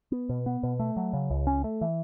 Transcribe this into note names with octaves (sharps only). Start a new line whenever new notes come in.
B3
B2
B3
B2
A3
F#3
C#3
C#2
C#4
A3
E3